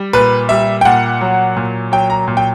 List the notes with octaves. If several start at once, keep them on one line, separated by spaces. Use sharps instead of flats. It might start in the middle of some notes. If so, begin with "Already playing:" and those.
Already playing: G3
A#2 B4
G3 E5
G5
A#2 F#5
F#3
A#2
F#3 G5
A#5
A#2
G5